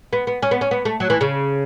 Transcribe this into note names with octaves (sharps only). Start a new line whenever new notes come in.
B3
B3
C#4
B3
C#4
B3
A3
F#3
E3
C#3